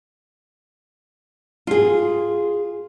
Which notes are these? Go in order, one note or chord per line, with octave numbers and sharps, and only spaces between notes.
F4 G#4